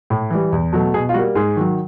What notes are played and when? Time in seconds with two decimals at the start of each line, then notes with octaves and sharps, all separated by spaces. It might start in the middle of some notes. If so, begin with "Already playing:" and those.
0.10 A2
0.30 E3 G3
0.52 E2
0.72 B2 F#3 A3
0.94 B2 G#4
1.09 F4
1.14 G3 A#3 F#4
1.35 G#2 G#4
1.57 D#3 F#3